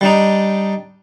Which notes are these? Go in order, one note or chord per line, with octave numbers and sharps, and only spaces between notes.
G3 D4 D#4